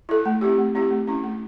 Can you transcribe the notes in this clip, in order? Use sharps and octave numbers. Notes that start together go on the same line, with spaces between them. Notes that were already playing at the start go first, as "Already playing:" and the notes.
E4 A4
A3
C4 E4 G4
A3
C4 E4 G4
A3
C#4 E4
A3